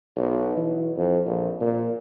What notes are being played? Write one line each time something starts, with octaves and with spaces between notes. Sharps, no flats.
B1
E3
F2
A#1
A#2